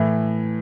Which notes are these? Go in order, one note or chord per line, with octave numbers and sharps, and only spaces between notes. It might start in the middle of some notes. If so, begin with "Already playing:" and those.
Already playing: A2 E3